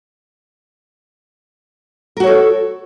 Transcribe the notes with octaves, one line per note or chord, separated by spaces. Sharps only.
F#4 A4 A#4 C#5